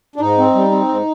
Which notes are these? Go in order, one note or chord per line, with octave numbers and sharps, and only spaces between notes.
D4
G#2 D#4
C4
G3
C4
G#2